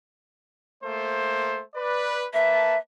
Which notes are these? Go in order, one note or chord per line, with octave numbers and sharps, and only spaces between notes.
A3 A#3 C5
B4 D5
A#3 B4 E5 A5